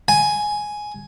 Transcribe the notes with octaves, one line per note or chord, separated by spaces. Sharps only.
G#5